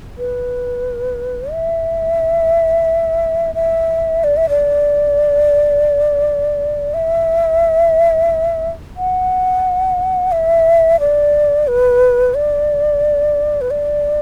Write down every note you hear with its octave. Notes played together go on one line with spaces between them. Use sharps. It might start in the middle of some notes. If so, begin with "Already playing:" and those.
B4
E5
E5
D5
E5
D5
E5
F#5
E5
D5
B4
D5
B4
D5